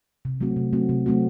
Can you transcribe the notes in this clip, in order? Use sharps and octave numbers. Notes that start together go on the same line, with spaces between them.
C3
F#3 A3 C4 F#4
C3
F#3 A3 C4 F#4
C3
F#3 A3 C4 F#4